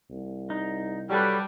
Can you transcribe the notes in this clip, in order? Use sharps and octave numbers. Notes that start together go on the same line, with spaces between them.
C2
D#4
F#3 G3 A4 B4